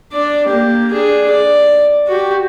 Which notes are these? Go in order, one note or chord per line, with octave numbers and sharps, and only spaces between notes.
D4 D5
A#3 G4
D4 G#4
D5
F#4 G4